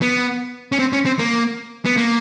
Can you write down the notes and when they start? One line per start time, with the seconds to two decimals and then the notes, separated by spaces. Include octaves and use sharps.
0.02 B3
0.72 C#4
0.79 C4
0.93 C#4
1.06 C4
1.19 A#3
1.85 B3
1.97 A#3